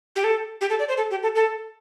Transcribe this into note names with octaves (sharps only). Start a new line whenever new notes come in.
G4
A4
G4
A4
D5
C5
A4
G4
A4
A4